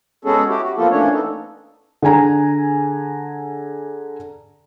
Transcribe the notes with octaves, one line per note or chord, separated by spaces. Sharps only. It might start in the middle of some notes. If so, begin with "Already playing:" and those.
G#3 B3 C#4 F#4 G#4 A4
E4 F#4 G4
F#4
F3 A#3 B3 F4 A4
E3 A3 A#3 C#4 D4 C#5
B3 D#4 A4
D3 G#4 G#5 A#5